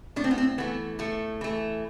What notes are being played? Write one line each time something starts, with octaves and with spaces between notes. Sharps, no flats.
A2 D4
C4
B3
C4
E3 A3 B3
A2 A3
E3 A3